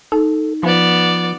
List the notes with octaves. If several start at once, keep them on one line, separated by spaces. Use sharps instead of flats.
D#4 A4
F3 B3 D5